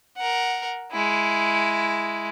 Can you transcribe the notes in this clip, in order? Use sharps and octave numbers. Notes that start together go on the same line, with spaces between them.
A#4 F#5
G#3 E4